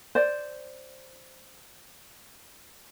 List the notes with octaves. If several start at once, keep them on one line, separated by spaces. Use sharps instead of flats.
C5 D5